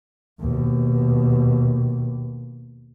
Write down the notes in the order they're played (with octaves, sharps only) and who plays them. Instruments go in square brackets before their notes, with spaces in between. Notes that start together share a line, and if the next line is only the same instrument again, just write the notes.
[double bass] D#2 B2